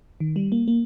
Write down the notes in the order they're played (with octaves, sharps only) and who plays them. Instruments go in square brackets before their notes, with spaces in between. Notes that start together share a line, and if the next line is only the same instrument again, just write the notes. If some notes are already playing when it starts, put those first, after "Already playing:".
[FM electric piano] D#3
G3
A#3
A#3